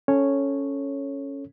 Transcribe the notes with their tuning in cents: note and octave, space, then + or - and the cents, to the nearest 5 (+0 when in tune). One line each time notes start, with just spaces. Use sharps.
C#4 +0 A4 +0 C#5 -5